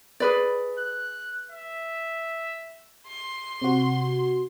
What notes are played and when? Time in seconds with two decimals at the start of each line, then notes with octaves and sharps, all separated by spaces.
0.20 G#4 B4 D5
0.79 F#6
1.51 E5
3.07 C6
3.62 C3 F#4